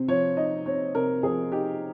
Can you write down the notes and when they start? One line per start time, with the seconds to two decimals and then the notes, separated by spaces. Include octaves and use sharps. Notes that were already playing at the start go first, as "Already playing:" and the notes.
Already playing: C3 C4
0.08 F3 C#5
0.37 D#4 D#5
0.66 C4 C#5
0.94 C3 A#4
1.23 F3 G#4
1.52 D#4 G4